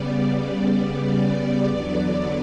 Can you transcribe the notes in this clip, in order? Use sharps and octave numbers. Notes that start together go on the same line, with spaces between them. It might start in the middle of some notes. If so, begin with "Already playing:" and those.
Already playing: C#3 G3 B3 D5
D5
E2 D3 F#3 B3